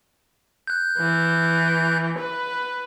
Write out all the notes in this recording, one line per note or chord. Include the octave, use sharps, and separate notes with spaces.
F#6 G6
E3
B4